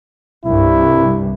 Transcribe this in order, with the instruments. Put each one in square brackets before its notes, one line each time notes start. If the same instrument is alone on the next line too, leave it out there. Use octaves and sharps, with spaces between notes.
[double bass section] C2 G2 [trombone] E4